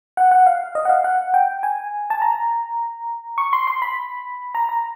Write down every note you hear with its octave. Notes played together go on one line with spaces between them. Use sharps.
F#5
F#5
F5
D#5
F#5
F5
F#5
G5
G#5
A5
A#5
C#6
C6
C6
B5
A#5
A#5